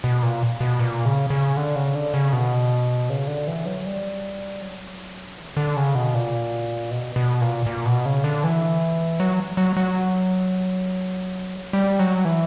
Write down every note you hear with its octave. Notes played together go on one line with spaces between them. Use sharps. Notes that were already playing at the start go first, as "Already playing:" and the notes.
B2
A#2
B2
A#2
C#3
C#3
D3
C#3
D3
C#3
B2
C#3
D3
E3
F#3
G3
F#3
E3
C#3
D3
C#3
B2
A#2
B2
B2
A#2
A#2
B2
C#3
D3
E3
F#3
F#3
F#3
G3
F#3
E3